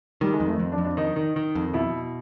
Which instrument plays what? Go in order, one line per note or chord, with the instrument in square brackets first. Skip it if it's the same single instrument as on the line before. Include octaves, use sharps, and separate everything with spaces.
[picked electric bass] D#3 [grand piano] G3
[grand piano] G#3
[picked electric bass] F2
[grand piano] A3
[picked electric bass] F2
[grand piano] D4
[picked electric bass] F2
[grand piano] D4
[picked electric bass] D#3 [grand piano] D#4
[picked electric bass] D#3
D#3
F2
[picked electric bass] B2 [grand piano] E4